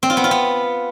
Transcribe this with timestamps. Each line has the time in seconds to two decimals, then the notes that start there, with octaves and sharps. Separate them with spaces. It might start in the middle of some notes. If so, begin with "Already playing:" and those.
0.03 C4
0.10 F4
0.17 B3
0.24 F4
0.31 B3